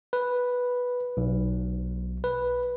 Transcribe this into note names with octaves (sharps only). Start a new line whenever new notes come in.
B4
B1
B4